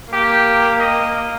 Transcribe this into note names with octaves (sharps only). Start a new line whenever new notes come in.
A#3 G4
D#5